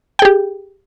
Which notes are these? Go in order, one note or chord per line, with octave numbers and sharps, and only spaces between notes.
G4 G#4 G5